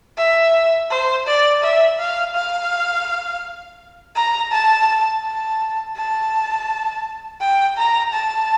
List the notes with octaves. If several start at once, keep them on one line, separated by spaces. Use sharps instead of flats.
E5
C5
D5
E5
F5
F5
A#5
A5
A5
A5
G5
A#5
A5